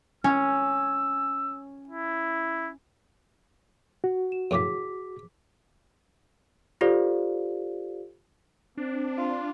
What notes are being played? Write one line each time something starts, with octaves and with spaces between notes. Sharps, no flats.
C#4 E6
E4
F#4
E7
F#2 A2 C#3 G#4 D6 B6
F4 G4 A4 C5 D5 F5
C4 D4
F4